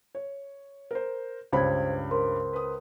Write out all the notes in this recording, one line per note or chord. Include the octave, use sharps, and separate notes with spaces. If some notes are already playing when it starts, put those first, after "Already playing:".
C#5
A#4 C5
C#2 G2 C5 C#5 B5 G#6
A#4 C5 C6
B4 D#6